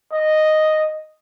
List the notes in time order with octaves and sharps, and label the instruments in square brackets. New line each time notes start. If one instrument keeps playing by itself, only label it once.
[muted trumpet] D#5